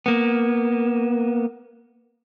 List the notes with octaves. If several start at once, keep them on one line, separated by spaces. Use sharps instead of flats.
A#3 B3